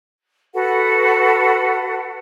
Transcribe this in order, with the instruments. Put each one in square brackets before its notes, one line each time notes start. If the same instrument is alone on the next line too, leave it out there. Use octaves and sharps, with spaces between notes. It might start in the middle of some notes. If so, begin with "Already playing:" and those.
[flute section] F#4 A4 B4 F#5